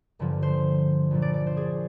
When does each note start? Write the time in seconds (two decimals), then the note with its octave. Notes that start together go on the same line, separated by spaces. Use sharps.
0.19 G1 G2 D3 F3
0.43 C5
1.11 A#1 A#2 F3
1.22 D5
1.34 D5
1.46 C5
1.57 G#4